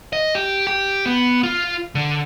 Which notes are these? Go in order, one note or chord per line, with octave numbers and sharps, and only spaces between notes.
D#5
G4
G4
B3
F4
D3